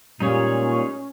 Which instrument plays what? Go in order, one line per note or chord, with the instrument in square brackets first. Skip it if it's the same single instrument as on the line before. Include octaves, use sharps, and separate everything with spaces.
[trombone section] A#2 [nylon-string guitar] G3 G#3 [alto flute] C#4 [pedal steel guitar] D#4 G#4 C#5